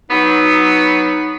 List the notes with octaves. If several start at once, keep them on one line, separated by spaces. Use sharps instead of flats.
F#3 B3 D#4